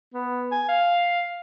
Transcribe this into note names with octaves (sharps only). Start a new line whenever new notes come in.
B3
G#5
F5